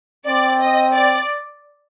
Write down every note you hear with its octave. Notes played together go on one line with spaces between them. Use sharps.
C4 D5
D#5
D5